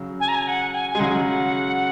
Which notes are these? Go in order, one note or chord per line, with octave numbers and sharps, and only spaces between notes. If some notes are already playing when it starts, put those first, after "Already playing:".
Already playing: C#3 F#3
G#5
A#5
G#5
F#5
G#5
G#5
G#3
C#3 F#3 F#5